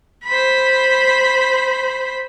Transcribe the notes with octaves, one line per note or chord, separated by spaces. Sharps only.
C5 B5